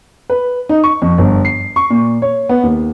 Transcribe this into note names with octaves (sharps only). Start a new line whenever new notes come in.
B4
D#4
C#6
F2
G1
C7
C#6
A#2
C#5
B3
D#2